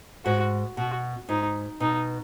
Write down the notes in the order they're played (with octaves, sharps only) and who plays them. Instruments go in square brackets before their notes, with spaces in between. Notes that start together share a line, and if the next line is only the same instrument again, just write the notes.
[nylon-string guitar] G#2 [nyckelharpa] F#4
[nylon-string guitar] B2 [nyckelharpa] F#4
[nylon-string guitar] G#2 [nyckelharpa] D#4
[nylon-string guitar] B2 [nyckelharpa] D#4